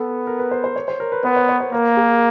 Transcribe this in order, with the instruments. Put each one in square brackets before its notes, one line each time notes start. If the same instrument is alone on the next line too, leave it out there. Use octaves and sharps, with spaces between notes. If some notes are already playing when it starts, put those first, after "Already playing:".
Already playing: [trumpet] B3 [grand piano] A4
[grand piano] A#4
B4
C5
C5
C#5
C5
A#4
B4
[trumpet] B3 [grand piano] C5
[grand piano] C#5
C#5
C5
[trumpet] A#3 [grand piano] A#4
[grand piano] G#4